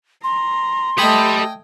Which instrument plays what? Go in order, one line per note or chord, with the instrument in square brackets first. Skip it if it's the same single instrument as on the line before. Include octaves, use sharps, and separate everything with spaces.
[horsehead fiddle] A#5 [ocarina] C6
[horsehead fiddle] A3 D#5 [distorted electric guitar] G4 B5 [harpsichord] G5 G#5 D#6